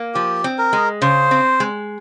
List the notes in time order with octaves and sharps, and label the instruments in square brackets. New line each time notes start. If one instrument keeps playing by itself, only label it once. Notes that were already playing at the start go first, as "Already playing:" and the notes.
Already playing: [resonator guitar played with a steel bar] A#3
[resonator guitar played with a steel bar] F3 [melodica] G4
[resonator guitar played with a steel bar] C4
[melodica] A#4
[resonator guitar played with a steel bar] G#3
[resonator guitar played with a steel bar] C#3 [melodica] C5
[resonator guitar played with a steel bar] C4
G#3